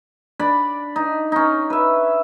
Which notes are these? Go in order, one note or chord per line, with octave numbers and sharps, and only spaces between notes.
D4 D5 B5
D#4
C#4 D#4
B4 E5